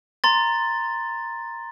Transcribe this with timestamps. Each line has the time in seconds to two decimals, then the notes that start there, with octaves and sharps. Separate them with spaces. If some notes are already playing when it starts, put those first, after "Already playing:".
0.24 A#5 C6 A6